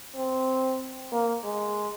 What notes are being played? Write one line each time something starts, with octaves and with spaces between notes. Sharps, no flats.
C4
A#3
G#3